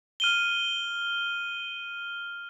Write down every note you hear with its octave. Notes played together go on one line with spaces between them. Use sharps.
F6 D#7 G7